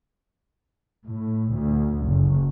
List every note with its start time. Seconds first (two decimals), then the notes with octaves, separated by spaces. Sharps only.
1.04 A2
1.53 D2
2.07 F#1